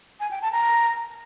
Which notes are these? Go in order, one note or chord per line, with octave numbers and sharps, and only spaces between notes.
G#5
G5
A5
A#5